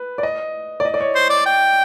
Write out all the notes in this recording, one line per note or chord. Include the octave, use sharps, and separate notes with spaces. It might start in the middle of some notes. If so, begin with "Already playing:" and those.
Already playing: B4
D5
D#5
D5
D#5
D5
C#5
C5
D5
G5